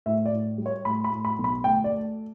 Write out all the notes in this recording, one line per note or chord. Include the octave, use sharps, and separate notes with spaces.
A2 E5
D5
A2
G3
C#5
A2 B5
B5
A2
B5
B1
B5
D2 G5
D5
A3